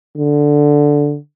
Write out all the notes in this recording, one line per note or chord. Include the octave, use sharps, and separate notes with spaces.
D3